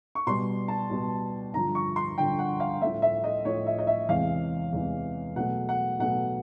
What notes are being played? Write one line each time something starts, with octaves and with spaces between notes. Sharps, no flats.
C#6
B2 G3 C6
A5
B2 G3
G2 D3 F3 A#5
C#6
C6
G2 D3 F3 G5
F#5
F5
A2 F3 A3 E5
E5
D#5
A2 F3 A3 C#5
E5
D#5
E5
E2 C3 E3 G#3 F5
E2 C3 E3 G#3
B2 F#3 A3 F#5
F#5
B2 F#3 A3 F#5